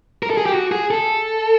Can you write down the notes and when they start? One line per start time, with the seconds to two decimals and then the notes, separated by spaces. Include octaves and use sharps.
0.23 A#4
0.30 A4
0.37 G#4
0.46 G4
0.52 F#4
0.72 G#4
0.91 A4